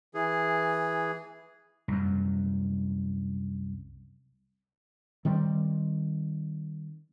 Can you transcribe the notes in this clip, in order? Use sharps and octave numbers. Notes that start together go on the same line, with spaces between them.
E3 G#4
C2 F#2
D#3 G3 C4